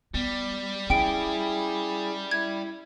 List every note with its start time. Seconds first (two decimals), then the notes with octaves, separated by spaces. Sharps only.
0.14 G3 B3
0.90 C#4 E4 G#4 G5 D7
2.31 E4 G#6